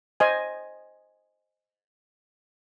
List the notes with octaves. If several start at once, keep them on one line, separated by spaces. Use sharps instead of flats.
C5 D#5 G#5